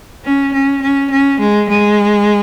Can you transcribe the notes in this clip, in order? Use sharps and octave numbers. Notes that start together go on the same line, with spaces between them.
C#4
C#4
C#4
C#4
G#3
G#3